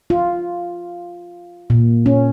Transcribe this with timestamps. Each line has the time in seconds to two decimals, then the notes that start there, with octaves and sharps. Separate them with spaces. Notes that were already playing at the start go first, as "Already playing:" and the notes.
0.10 F4
1.70 A#2
2.06 C#4